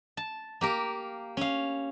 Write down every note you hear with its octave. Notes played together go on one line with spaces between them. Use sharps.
A5
A#3 G4 A#4
C#4 F5